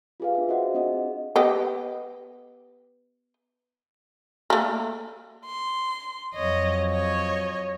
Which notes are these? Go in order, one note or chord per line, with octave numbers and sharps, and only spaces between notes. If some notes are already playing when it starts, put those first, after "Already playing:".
F4 G4 G#4 B4 F5
D4 E5
F#4 C5 D#5 F#5
C4 D4 G4 G#4 D#5
B3 G4 D#5
A3 A#3
C6
F2 F#3 C#5 D#5
C#5 D#5